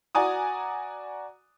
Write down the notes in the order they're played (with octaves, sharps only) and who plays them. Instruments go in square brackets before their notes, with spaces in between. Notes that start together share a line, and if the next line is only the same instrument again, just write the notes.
[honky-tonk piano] F#4 D5 G#5 A#5 D#6